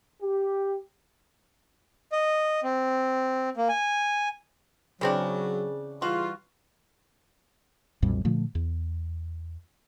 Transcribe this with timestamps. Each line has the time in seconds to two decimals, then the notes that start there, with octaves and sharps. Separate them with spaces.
0.23 G4
2.12 D#5
2.63 C4
3.57 A#3
3.69 G#5
5.01 C#3 E3 F#3 C4 D4
6.02 E3 G3 F4 F#4
8.02 B1 F2 A#2 G3
8.25 A#2 D3 F3 A3
8.55 E2